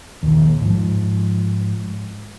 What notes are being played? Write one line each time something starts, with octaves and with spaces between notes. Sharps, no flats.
A#1 D#2
G#2 F3